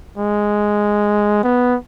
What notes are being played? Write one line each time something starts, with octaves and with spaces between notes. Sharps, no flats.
G#3
B3